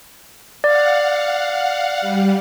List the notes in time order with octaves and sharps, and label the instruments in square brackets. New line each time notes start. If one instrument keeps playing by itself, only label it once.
[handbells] D5 [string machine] F5 F#5
[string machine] G3